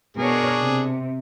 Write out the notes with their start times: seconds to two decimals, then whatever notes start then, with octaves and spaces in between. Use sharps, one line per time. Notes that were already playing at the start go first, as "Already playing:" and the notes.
0.17 B2 D4 G#4 A#4 C#5
0.59 C3